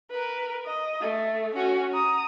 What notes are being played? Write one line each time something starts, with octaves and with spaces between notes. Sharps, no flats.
A#4 B4
D#5
A3
C#4 F#4
A#5 D#6